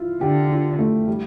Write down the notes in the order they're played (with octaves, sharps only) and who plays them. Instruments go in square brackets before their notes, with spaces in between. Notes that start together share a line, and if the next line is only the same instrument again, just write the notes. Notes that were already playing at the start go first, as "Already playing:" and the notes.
Already playing: [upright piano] E4 F4
[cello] D3 [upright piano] G4
[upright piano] F4
A3
G3